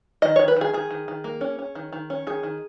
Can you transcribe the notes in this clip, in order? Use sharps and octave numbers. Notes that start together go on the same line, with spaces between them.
D#3 D#5
D#3 C#5
B4
D#3 G#4
D#3 G#4
D#3
D#3
A#3
C#4
C#4
D#3
D#3
C#4
D#3 G#4
D#3